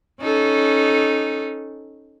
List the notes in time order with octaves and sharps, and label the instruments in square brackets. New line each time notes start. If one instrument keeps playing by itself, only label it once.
[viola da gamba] C#4 D#4 A4